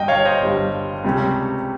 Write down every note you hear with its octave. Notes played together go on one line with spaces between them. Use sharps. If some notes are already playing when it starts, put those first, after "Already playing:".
Already playing: G1 G2 G3 D#5 G5
C#5 F5
C5 D#5
G1 G2 G3
C#2 C3 G3 C#4